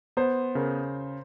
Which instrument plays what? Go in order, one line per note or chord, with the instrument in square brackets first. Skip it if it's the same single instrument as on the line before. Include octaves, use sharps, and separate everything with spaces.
[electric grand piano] B3 [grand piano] C5
[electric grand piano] C#3 [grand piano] A#4